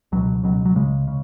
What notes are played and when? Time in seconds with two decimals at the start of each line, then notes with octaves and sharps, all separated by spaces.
0.12 C#2 B2 F#3
0.43 C#2 B2 F#3
0.65 F#3
0.75 C#2 C#3 G#3
1.08 C#3